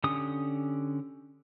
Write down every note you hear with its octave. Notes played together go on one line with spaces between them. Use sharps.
D3 C#4 G4 D#6